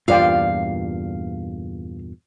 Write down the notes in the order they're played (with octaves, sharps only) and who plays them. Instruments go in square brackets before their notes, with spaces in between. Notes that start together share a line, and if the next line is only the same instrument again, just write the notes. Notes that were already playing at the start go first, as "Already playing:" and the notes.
[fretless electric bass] E2 G2 A#2 [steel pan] F4 D5 G5 [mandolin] F5